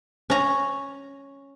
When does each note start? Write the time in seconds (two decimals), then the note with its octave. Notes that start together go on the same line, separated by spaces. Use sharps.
0.30 C#4 A#5